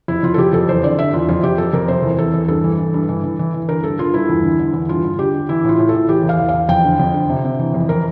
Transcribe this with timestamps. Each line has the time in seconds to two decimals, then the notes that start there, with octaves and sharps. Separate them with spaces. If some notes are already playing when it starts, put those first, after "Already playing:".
0.08 F2 E4
0.23 F2 F4
0.34 A4
0.38 F2 G4
0.53 F2 A4
0.69 E2 C5
0.84 D3 D5
0.99 D3 E5
1.13 E2 F4
1.28 F2 F4
1.43 F2 G4
1.58 F2 A4
1.73 F2 A#4
1.88 C3 C5
2.03 E2
2.18 E2 A4
2.34 E2
2.48 G2 A4
2.64 E3
2.78 E3
2.94 G2
3.09 E3
3.24 E3
3.39 E3
3.54 E3
3.69 D3 A#4
3.84 G2 A4
3.99 G2 F4
4.14 G2 E4
4.29 E2
4.43 D3
4.59 D3
4.73 E2
4.89 G2 F4
5.04 D3
5.19 D3 G4
5.34 D3
5.49 E3 E4
5.64 A2 F4
5.79 A2
5.89 A4
5.94 A2
6.08 E3 G4
6.23 E2
6.29 F5
6.40 E2
6.49 F5
6.54 E2
6.69 F2 G5
6.84 D3
7.00 F2
7.14 D3
7.29 C3
7.44 C3
7.59 E3
7.74 F2
7.89 E3 A#4